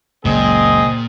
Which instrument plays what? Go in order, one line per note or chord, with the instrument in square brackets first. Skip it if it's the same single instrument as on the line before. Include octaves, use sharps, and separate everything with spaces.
[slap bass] F#1 C#2 [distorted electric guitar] A#2 [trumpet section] C4 G#4 D#5